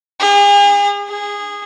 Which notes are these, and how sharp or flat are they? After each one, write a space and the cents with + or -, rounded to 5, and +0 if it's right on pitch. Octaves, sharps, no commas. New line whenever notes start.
G#4 -40
G#4 -15